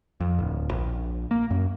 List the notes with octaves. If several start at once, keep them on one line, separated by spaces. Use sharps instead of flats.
F2
D1
A#1
A#3
F#2